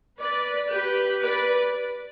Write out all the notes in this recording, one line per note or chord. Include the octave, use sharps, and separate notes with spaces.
B4 D5
G4 B4
B4 D5